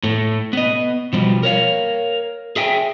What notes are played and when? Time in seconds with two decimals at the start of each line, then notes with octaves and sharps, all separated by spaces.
0.03 A2 A3
0.53 B3 D#5
1.13 B2 F3 G3
1.43 A#4 C#5 F5
2.56 G#4 E5 G5 G#5